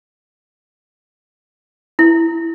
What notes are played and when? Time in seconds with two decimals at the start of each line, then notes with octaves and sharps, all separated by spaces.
1.99 E4